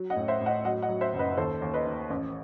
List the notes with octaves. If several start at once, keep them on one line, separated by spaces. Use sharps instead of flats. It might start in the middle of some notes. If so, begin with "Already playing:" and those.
Already playing: F#3
D#5 F#5
A2
C5 E5
A2
D#5 F#5
F#3 D#5 F#5
D#5 F#5
F#3
C5 E5
F#1
B4 D#5
D#2 A4 C5
D#2
B4 D#5
D#3
A1